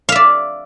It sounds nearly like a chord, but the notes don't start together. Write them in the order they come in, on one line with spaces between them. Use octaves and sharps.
F5 E5 D5